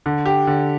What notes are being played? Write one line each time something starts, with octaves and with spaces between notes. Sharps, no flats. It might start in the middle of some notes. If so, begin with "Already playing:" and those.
D3
G4
D3